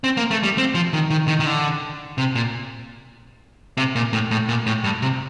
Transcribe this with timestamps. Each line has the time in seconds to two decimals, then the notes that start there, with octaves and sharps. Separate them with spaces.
0.04 C4
0.17 A#3
0.31 A3
0.43 G3
0.58 C4
0.75 F3
0.93 D#3
1.10 D#3
1.28 D#3
1.40 D#3
1.46 D3
2.18 C3
2.35 A#2
3.77 C3
3.95 A#2
4.13 A2
4.31 A2
4.49 A#2
4.66 A2
4.84 G2
5.02 C3